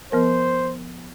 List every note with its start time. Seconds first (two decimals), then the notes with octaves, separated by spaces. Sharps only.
0.12 F3 B3 A#4 C5